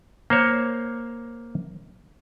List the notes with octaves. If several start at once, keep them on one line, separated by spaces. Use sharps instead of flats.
A#3 C5 C#5